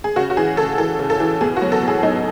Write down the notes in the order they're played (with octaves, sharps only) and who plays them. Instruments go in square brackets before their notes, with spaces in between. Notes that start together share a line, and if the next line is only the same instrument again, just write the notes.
[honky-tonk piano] G#4
C#3 F#4
F#4
E3 G#4
C#3 A4
E3 A4
C#3
A4
E3
B2 G#4
F#4
F#3
A4
B2
G#4
F#3 D#4